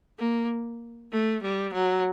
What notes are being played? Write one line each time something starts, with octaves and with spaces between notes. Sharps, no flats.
A#3
A3
G3
F#3